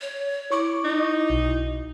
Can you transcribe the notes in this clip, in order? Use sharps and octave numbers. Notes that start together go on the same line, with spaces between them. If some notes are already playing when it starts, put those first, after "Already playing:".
C#5
E4 C#6 D6
D#4
B1